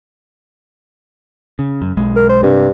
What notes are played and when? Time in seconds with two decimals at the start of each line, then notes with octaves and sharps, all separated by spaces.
1.59 C#3
1.82 F#2
1.97 B1 G#3
2.16 A#4
2.29 C5
2.43 G2 C3